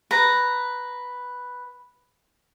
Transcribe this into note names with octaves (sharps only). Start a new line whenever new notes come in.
B4 A#5